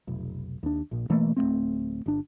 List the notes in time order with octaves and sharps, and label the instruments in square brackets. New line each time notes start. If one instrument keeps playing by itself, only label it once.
[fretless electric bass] F1 B1
D#2 D4
A#1 A#2
B2 E3 A3 A#3
D1 E2 A3 C4
G1 D4